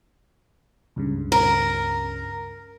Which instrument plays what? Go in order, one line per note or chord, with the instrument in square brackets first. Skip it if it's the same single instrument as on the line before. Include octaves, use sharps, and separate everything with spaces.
[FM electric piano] C#2 G2 C#3
[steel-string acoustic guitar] A#4